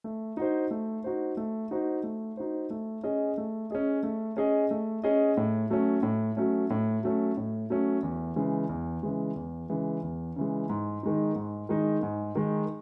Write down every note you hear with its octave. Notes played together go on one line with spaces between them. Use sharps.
A3
D#4 F#4 C5
A3
D#4 F#4 C5
A3
D#4 F#4 C5
A3
D#4 F#4 C5
A3
C#4 G#4 D#5
A3
C#4 G#4 D#5
A3
C#4 G#4 D#5
A3
C#4 G#4 D#5
A2
F#3 A3 C#4
A2
F#3 A3 C#4
A2
F#3 A3 C#4
A2
F#3 A3 C#4
E2
C#3 E3 G#3
E2
C#3 E3 G#3
E2
C#3 E3 G#3
E2
C#3 E3 G#3
G#2
D#3 G#3 D#4
G#2
D#3 G#3 D#4
G#2
D#3 G#3 D#4